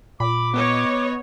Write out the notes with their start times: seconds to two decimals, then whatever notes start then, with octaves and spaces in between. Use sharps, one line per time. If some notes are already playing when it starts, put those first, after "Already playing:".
0.20 A#2 B5 D6
0.54 B3 C#5 D#5